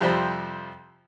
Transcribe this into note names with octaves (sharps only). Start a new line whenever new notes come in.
F2 C3 F3 G3 C5 B5